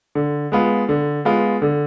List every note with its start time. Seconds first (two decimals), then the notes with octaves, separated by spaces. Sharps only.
0.15 D3
0.52 G#3 B3 F4
0.89 D3
1.25 G#3 B3 F4
1.62 D3